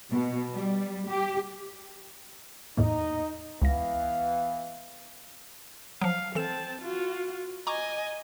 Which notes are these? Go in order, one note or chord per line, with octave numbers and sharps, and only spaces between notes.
B2
G3
G4
E2 A2 A#3 D#4
C#2 E3 B3 F5 A#6
F3 F#3 F5
E3 C4 A4 A5 E7
F4 F#4
D#5 G#5 A#5 C#6 D6